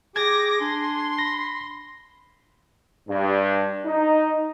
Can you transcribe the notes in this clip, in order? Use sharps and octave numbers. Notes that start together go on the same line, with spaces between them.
G4 G#4 D6 G#6 A#6
D4 G#5 C6
B5 A#6
G2
D#4